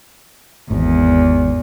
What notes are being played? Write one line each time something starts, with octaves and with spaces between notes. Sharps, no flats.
G#1 E2